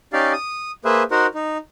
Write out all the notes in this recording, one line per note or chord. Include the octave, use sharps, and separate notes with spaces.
C#4 D#4 G4 D5 F5
D#6
A#3 G#4 B4 C5 E5
D#4 F#4 A#4 C5 F#5
D#4